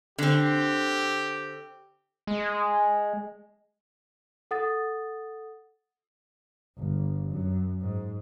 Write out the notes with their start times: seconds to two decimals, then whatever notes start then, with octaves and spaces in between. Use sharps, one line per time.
0.18 D3 C4 G4
2.27 G#3
4.51 A4 F#5 D#6 A6
6.78 G1
7.31 F#2
7.81 G#2